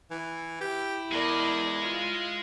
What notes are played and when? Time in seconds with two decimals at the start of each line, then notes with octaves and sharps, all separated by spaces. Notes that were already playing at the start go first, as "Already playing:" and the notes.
0.11 E3
0.61 E4 G4
1.12 E2 G#3 A#4 D5 D#5
1.80 F4 F5